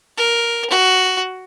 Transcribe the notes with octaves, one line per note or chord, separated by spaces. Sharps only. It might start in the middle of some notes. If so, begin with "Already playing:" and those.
A#4
F#4